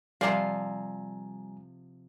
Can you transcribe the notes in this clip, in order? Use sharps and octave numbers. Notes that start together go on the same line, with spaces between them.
C3 F3 G3 F4 D5 F5 G#5 A#5